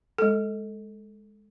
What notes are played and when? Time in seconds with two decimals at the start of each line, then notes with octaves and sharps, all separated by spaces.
0.18 G#3 A4